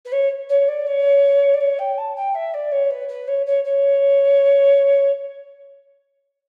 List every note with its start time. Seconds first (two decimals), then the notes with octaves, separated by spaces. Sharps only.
0.05 B4
0.12 C#5
0.49 C#5
0.68 D5
0.86 C#5
1.53 D5
1.60 C#5
1.79 G5
1.98 A5
2.15 G5
2.34 E5
2.54 D5
2.71 C#5
2.90 B4
3.08 B4
3.28 C#5
3.46 C#5
3.64 C#5